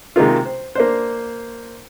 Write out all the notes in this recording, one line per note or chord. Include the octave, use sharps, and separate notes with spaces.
C3 D#3 G#3 A#3 F4
C5
A#3 D4 C5